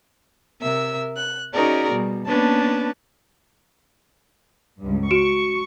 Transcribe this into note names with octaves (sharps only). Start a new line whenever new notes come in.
C3 A#4 E5 E6
F#6
C#4 D#4 F#4 G#4 A#4 D5
B2 G3
A#3 B3 C#4 D4 B4 A5
C#2 G2
F#4 C#6 D7 E7